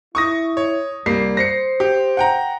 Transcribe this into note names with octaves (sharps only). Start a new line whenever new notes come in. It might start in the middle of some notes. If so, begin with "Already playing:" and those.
E4 C#6 D#6 A#6
C#5
C2 G3 A#3 C7
C5 A#6 C7 C#7
G4
F#5 G5 A#5